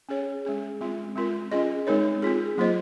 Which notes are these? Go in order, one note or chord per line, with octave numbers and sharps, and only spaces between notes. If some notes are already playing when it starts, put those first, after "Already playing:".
C#4 G#4 C#5
G#3 C#4 G#4
G#3 C4 F4
G#3 C4 F4 A#4
C#4 F4 G#4 D#5
G#3 C4 D#4 A#4 C#5
C4 F4 G#4
F#3 A#3 F4 C5 D#5